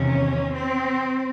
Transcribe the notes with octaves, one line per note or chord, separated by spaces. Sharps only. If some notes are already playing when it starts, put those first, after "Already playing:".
Already playing: E2 C3 D#3 C#4
C4